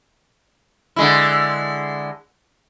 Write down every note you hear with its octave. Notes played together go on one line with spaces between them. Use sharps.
D3 G#3 E4